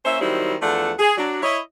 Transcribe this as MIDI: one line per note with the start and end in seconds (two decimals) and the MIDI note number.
0.04 0.19 58
0.04 0.19 61
0.04 0.19 72
0.04 0.19 73
0.04 0.19 76
0.21 0.55 51
0.21 0.55 54
0.21 0.55 55
0.21 0.55 60
0.21 0.55 63
0.21 0.55 64
0.62 0.92 40
0.62 0.92 53
0.62 0.92 57
0.62 0.92 62
0.62 0.92 69
0.62 0.92 78
0.99 1.17 68
1.18 1.40 54
1.18 1.40 62
1.42 1.59 64
1.42 1.59 73
1.42 1.59 75